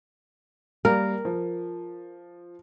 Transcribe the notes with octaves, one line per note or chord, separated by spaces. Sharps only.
G3 A#3 A#4
F3